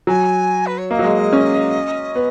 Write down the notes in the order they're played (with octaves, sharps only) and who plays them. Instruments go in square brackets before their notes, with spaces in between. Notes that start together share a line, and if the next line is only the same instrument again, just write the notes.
[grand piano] F#3 [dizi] G#5
[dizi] B4
C#5
[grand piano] A#3 [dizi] D#5
[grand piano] F#3
G#3
G#3
C#4
B3